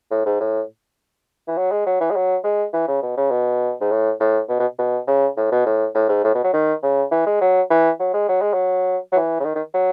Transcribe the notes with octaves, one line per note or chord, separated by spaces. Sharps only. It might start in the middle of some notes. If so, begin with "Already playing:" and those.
A2
G#2
A2
E3
F#3
G#3
F#3
E3
G#3
F#3
G#3
E3
C#3
B2
C#3
B2
G#2
A2
A2
B2
B2
B2
C#3
A2
B2
A2
A2
G#2
A2
B2
F#3
D#3
C#3
E3
G#3
F#3
E3
F#3
G#3
F#3
G#3
F#3
F#3
E3
C#3
D#3
D#3
F#3